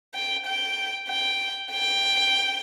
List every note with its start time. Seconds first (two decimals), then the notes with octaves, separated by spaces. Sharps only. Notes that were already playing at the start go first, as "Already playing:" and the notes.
0.15 G5
0.46 G5
1.09 G5
1.71 G5